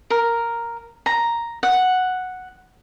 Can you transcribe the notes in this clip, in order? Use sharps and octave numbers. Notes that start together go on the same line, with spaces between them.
A#4
A#5
F#5